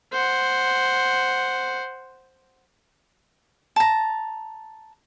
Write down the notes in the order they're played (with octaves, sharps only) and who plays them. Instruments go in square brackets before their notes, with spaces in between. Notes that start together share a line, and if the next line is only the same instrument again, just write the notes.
[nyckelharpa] C5 F#5
[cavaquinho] A5 A#5